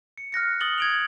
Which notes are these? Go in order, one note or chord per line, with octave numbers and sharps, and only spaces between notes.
C#7
F6 F#6 A#6 C#7
D#6 A6 F#7 G7
G#6 D7 F7